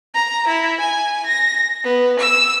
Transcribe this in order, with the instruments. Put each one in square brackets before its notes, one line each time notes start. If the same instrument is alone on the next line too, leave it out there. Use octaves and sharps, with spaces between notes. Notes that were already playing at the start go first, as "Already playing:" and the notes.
[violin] A#5
E4
G#5
A#6
B3
E6